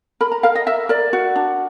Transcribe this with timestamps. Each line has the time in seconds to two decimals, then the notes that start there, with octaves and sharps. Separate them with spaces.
0.21 A#4 B5
0.32 A#5
0.43 A#4 F5
0.55 D#5
0.67 A#4 E5
0.89 A#4 D5
1.13 F#4
1.36 D4